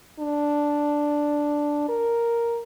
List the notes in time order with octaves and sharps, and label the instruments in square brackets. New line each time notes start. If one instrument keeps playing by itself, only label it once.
[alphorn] D4
A#4